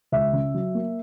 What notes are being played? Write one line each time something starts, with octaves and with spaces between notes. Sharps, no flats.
C#2 E5
C#3
F#3
A#3